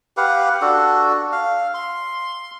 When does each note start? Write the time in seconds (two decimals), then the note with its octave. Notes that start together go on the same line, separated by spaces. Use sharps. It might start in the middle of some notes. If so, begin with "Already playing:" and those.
0.17 G4 B4 F5 F#5
0.62 D4 F#4 A4
1.32 F5
1.74 C6